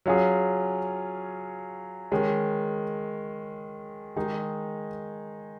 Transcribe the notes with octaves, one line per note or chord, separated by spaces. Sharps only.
F#3 C#4 F4 G#4
D#3 G#3 C#4
D#3 G#3 D#4 G#4